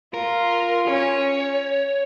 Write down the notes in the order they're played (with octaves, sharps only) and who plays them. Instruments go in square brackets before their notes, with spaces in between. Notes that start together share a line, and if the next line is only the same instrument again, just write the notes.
[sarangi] F4 [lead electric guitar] A#4
[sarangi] C#4 [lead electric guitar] C#5